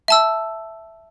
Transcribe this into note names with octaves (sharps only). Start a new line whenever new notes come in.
E5 A5 E6